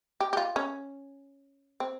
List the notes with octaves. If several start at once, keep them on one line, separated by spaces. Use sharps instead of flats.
G4
G4
F4
C#4
C4